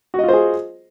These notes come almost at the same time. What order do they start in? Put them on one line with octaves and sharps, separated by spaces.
F#4 D#5 F4 C5 G#4